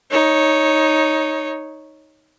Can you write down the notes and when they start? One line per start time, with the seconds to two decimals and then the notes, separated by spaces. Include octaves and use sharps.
0.11 D#4 C#5